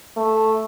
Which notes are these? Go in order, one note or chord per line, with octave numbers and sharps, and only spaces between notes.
A3